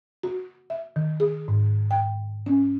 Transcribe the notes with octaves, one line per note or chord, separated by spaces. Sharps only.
F#4
E5
D#3
G#4
G#2
G5
C#4